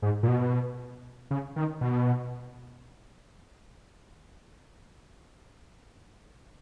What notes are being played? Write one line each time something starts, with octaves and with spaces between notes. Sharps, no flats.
G#2
A#2
B2
C#3
D#3
B2